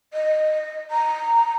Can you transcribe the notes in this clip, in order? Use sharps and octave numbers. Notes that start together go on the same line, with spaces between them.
D#5
A#5